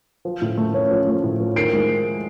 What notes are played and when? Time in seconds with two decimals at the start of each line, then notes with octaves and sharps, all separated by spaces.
0.25 F3
0.42 A2
0.57 A3
0.74 C#4
0.91 F3
1.07 A3
1.24 A2
1.40 F3
1.56 D#3 C7 D7
1.73 G#3